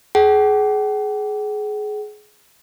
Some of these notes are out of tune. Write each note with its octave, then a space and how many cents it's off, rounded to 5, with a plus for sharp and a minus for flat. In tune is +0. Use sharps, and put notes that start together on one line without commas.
G#4 +25 F#5 +45